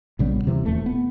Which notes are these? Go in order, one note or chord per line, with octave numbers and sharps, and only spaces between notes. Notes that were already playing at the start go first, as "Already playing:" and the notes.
A#1 C#3 G3 B3
D#1 C3 E3
D#1 E2 A3
B3